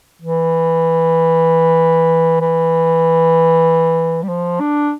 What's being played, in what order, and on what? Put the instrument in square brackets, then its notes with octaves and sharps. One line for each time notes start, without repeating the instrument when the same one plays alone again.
[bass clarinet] E3
E3
G3
F3
D4